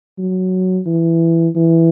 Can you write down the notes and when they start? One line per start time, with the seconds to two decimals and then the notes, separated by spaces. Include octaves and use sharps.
0.18 F#3
0.86 E3
1.56 E3